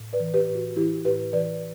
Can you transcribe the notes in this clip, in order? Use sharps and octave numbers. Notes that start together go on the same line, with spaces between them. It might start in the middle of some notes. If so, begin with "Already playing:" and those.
Already playing: A2
B4 D5
E3
G4 B4
A2
F#4
E3 E4 G4
A2 G4 B4
E3 B4 D5